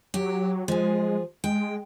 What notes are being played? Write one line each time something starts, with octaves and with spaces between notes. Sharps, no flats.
F#3 G4
F3 G#3 G#4
G#3 G5